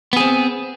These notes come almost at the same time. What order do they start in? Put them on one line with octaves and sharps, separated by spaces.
B3 G#4 C4